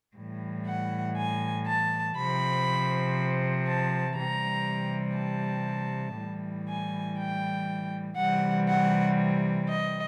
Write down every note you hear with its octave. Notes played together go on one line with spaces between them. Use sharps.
A2 E3 G3
F#5
G#5
A5
C3 F3 B5
A5
C3 E3 G3 A#5
A5
A2 E3 G3
G#5
G5
C3 E3 G3 F#5
F#5
D#5